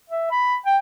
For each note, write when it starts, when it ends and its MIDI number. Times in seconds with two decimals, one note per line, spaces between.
0.10 0.31 76
0.31 0.56 83
0.66 0.77 79